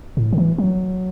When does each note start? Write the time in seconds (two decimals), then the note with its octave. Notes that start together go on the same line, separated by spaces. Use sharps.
0.17 A2
0.33 D3
0.38 E3
0.58 F#3